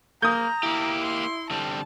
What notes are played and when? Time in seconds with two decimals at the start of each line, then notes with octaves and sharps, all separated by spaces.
0.22 A#3 A#5 D#6 G6
0.63 A#3 E4 G4
1.01 C6
1.51 D3 G3 C4 A5